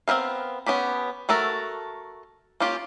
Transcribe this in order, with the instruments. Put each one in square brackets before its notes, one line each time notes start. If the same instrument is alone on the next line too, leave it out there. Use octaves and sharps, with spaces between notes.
[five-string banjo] B3 C4 A#4 B4 F5
B3 C#4 G4 B5
A3 F#4 A4 A#4
A#3 C#4 F4 G4